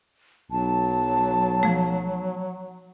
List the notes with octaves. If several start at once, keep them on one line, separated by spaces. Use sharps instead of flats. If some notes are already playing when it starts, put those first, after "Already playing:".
B1 F#3 A5
F3 A3